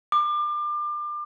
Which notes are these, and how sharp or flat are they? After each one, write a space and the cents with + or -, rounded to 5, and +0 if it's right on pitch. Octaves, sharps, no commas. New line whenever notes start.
D6 +30